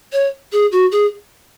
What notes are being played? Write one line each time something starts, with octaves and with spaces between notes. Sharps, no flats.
C#5
G#4
F#4
G#4